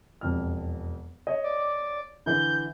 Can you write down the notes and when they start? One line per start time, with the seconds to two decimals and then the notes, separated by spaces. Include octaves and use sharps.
0.21 E1 F2 F6
1.27 C#5 D#5
1.44 D5
2.26 D3 E3 G6